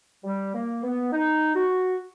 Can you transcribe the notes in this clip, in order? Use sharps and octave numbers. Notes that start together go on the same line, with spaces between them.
G3
A#3
B3
D#4
F#4